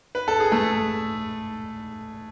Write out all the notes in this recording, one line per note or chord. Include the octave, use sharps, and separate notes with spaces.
B4
A4
G#4
A3 A4